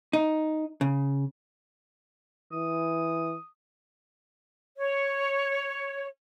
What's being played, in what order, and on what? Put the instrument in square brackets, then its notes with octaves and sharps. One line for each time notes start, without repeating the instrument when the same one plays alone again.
[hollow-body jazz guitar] D#4
C#3
[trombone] E3 [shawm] D#6
[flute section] C#5